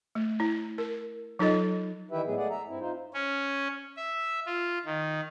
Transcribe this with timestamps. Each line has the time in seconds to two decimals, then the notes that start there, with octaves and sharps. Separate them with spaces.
0.15 A3
0.40 E4
0.78 A#4
1.39 F#3 D#4 F4 A4 D#5
2.11 D#3 E3 E4 G4 B4 E5
2.26 A2 F#3 G#3 B3 G#4
2.37 G#3 A3 G#4 D5 F#5
2.50 E5 A#5
2.68 G2 C4 E4
2.80 D#4 F4 C5
3.14 C#4
3.97 E5
4.46 F4
4.86 D#3